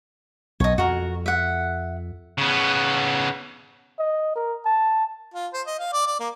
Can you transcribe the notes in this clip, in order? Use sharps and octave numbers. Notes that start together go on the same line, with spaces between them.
B1 C#5 D#5
F2 F#4 A#4
E5 F#5
C#3 B3
D#5
A#4
A5
F4
C5
D#5
F5
D5
D5
A#3